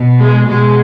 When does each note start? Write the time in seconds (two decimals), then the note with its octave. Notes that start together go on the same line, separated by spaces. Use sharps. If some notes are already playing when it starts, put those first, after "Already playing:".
Already playing: B2
0.20 G#3
0.48 B2 G#3